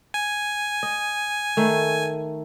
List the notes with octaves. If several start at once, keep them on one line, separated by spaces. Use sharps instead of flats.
G#5
D#5
D#3 A3